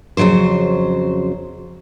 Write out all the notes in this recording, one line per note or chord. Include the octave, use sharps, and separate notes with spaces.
F2 C#3 F3 F#3 C5